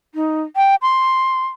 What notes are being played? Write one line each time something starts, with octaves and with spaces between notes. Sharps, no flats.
D#4
G5
C6